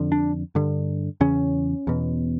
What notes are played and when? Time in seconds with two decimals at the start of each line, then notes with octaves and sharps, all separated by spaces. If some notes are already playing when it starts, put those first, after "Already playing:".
Already playing: F2 D3
0.12 D4
0.55 G2 D3
1.21 E2 C#3 C#4
1.87 E2 B2